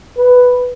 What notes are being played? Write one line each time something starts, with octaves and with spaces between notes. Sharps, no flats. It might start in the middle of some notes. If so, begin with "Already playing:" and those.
B4